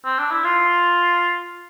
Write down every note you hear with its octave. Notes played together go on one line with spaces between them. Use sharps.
C4
D4
E4
F4